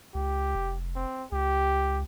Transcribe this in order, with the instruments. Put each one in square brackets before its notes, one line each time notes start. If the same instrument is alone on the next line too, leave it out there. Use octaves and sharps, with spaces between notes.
[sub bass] C#2 [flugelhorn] G4
[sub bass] F1
[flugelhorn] C4
[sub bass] C#2 [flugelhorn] G4